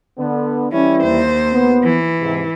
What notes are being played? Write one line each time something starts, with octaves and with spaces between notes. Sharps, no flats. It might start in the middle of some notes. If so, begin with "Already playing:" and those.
D3 B3
E3 G3 C#4 E4
D#2 C5
B3
E3
G#2 C3